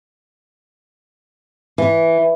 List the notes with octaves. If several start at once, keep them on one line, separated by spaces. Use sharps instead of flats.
E3